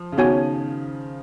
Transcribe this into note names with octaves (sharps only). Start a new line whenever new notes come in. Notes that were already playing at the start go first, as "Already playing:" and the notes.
Already playing: F3
C#3
D#3 B3 F#4 C#5 G#5